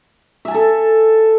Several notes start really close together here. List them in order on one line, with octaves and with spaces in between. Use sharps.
E5 G#5 A5 A4